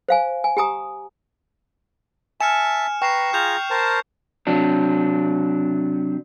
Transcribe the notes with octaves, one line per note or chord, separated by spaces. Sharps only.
C5 F5 G#5
G#5
G4 G#5 A#5 D#6
E5 G#5 A5 F6 C#7 E7
B4 G5 A#5 C#6 C7 E7
F4 G#4 A#5 F6 G6 F7
A#4 C5 A5
C3 F#3 D4